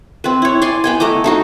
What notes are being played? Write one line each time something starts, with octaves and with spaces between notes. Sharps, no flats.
C4 B4
E4 C#5
D5 G#5 C6
B3 G5 G#5
A3 D#5 A#5 D6
A3 D#4 F#4